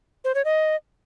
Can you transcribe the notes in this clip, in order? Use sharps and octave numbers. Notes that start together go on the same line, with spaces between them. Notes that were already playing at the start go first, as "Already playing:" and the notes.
C5
C#5
D#5